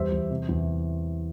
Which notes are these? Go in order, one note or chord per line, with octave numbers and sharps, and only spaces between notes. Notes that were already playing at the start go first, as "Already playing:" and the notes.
Already playing: E2 G3 C5 E5
E2
C3
E2